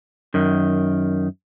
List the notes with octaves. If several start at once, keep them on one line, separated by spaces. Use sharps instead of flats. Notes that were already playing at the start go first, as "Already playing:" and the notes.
F#2 D#3